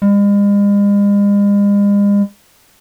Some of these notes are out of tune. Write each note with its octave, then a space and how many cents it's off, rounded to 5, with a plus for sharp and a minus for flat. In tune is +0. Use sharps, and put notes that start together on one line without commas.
G#3 -45